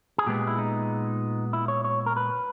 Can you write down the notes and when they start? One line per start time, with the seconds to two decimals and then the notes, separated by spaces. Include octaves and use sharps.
0.18 G#4
0.26 A#2 G#3 B3 G4
0.47 E4
0.58 D#4
1.53 E4
1.68 C#5
1.84 C#5
2.06 A#4
2.16 B4